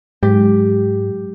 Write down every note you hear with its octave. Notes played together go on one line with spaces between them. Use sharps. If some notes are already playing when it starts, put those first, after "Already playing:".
G#2 F#3 G#3 G4